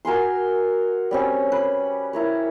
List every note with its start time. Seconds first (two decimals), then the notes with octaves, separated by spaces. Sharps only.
0.05 F#4 A#4 G#5 C6
1.11 G3 C4 C#4
1.52 B4
2.13 E4 A#4 C#5